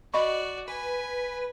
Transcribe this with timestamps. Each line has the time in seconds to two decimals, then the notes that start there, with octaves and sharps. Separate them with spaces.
0.14 F#4 D5 D#5 B5 C#6
0.68 B4 G#5